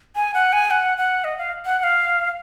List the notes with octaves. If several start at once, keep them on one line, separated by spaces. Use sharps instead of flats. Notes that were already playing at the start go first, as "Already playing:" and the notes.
G#5
F#5
G#5
F#5
F#5
D#5
F5
F#5
F#5
F5